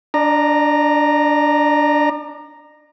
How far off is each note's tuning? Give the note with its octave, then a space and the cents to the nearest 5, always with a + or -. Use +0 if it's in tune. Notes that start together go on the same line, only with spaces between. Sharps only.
D4 -5 D5 +45 A#5 +0